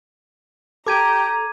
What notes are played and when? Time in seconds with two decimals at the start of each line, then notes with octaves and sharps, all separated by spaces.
0.87 G4 A4 A#5 D6 G#6 D#7